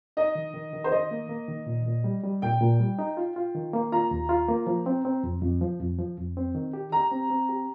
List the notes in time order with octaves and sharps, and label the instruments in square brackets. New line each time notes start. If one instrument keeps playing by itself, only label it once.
[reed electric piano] D#4 [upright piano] D#5
[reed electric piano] D#3
D#3
D#3
[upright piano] C5
[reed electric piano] D#3 [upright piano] D#5
[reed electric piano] A#3
A#3
D#3
A#2
A#2
G3
G3
[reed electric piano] A#2 [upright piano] G5
[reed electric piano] A#2
G3
D#4
F4
F4
D#3
A#3
[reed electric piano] F4 [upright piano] A#5
[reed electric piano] D#2
F4
A#3
F3
C4
C4
F2
F2
F3
F2
F3
F2
C4
D#3
G4
[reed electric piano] G4 [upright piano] A#5
[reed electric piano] C4
C4
G4